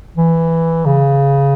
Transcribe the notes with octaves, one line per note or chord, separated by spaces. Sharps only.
E3
C#3